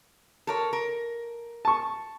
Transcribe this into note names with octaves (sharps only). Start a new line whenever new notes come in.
A4 A#4 C#5
A#4
A5 C#6